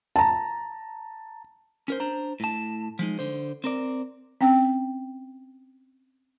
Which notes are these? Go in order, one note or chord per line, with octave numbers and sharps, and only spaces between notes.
A5 A#5
C#4 A#4 C5
D4 C5 A#5
A2 A5
F3 G#3 D#4
D3 C5
C4 A#4 D5
C4 C#4 G5